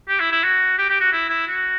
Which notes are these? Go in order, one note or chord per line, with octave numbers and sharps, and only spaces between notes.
G4
E4
E4
F#4
G4
G4
F#4
E4
E4
F#4